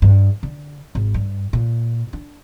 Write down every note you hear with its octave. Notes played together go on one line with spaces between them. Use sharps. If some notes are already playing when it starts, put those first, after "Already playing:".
G2
D3
G#1
G2
A#2
D4